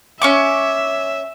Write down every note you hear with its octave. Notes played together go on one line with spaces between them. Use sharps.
C#4 E5 C#6 D6